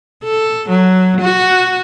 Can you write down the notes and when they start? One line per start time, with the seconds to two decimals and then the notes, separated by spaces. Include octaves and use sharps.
0.23 A4
0.69 F#3
1.21 F#4